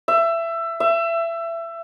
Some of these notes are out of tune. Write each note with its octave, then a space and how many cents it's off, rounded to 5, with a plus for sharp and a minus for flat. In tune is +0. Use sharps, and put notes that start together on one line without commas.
E5 +20
E5 +25